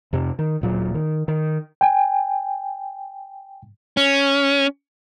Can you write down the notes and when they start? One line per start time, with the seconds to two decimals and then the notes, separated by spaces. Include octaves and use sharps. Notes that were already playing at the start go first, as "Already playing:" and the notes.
0.13 F2 C3
0.39 D#3
0.61 D1 A#2 F#3
0.95 D#3
1.28 D#3
1.81 G5 G#5
3.97 C#4